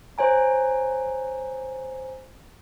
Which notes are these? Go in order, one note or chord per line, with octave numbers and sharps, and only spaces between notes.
C5 C#5 G#5 A#5